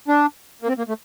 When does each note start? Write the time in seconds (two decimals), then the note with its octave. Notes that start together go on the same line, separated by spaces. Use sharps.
0.08 D4
0.62 A#3
0.68 C4
0.78 A#3
0.88 A3